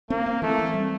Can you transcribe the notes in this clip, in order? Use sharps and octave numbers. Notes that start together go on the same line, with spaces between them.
A#3 C4
C4
E3 A3
C4
G3